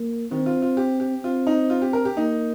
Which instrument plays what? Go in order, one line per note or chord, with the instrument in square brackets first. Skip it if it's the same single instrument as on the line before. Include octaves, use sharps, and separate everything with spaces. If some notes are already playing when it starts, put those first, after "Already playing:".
Already playing: [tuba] A#3
[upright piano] D#3 [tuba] C4
[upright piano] F4
F4
G4
G4
[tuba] C4 [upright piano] F4
[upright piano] D#4
F4
G4
A#4
G4
[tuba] A#3 [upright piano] D#4